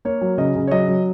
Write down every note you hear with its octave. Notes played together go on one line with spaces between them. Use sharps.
A#3 C#5
F#3
C#3 D#5
C#3
C#5
F#3 D#5
F#3